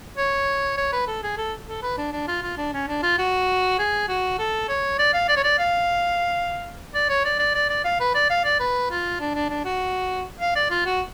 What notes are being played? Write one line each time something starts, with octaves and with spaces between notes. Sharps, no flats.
C#5
C#5
B4
A4
G#4
A4
A4
B4
D4
D4
F4
F4
D4
C#4
D4
F4
F#4
G#4
F#4
A4
C#5
D5
F5
D5
C#5
D5
F5
D5
C#5
D5
D5
D5
D5
F5
B4
D5
F5
D5
B4
F4
D4
D4
D4
F#4
F5
D5
F4
F#4